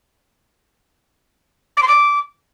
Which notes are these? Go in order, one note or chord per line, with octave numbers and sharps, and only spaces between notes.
D6
C6
D6